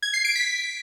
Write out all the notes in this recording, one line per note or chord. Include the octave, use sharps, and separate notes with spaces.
G#6
C7
D7
B6